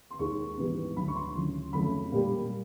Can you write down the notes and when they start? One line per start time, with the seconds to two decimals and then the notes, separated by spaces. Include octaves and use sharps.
0.11 C6
0.19 D#2 D#3 G#3 C#6
0.58 G#2 E3 G3 B3
0.96 D2 D3 F#3 B5
1.08 C#6
1.16 C6
1.35 D2 C#3 F#3
1.73 F2 C#3 F#3 A3 B5
2.12 A#2 G3 A#3